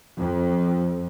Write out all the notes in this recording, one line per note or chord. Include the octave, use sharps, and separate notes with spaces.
F2